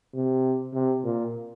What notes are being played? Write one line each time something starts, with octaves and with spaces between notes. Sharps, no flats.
C3
C3
A#2